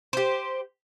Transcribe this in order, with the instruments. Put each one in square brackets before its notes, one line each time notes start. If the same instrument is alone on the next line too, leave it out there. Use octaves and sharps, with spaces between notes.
[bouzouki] G4 C5